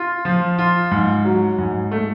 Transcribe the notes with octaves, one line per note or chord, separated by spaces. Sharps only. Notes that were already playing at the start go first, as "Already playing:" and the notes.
Already playing: F4
F3
F4
G#2
F#3
G#2
A3